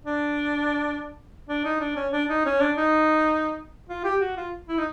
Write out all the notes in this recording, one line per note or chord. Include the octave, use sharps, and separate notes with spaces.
D4
D4
D#4
D4
C#4
D4
D#4
C#4
D4
D#4
F4
G4
F#4
F4
E4
D#4